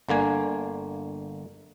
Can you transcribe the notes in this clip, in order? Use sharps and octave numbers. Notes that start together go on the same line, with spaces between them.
G1 D3 A#3 G#5